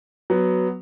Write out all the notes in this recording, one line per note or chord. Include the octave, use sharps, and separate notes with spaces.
F#3 B3